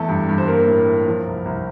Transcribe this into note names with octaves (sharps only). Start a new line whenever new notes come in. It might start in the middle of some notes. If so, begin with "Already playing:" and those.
Already playing: E2 A3 A4
G2
G2
C5
A#3 A#4
A2
A2
F3
C2
C2